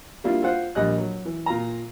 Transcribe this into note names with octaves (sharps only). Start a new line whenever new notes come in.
G3 A#3 D4 E4 F4
F4 C5 F5 F#5
A#1 G3 D#5 F#6
F#3
E3
A#2 F4 A#5